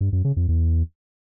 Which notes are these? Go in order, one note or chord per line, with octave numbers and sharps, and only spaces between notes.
G2
F#2
C#3
F2
E2